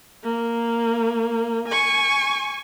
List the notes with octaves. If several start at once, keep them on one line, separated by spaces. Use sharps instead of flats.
A#3
G#5 C#6